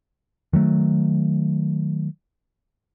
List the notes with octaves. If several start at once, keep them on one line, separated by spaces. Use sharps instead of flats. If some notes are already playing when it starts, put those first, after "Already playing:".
D#3 F#3 A3